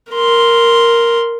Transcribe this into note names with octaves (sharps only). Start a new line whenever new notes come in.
A#4 C6